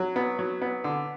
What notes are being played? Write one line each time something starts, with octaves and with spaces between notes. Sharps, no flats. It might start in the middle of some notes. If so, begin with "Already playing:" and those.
Already playing: F#3
B3
F#3
B3
D3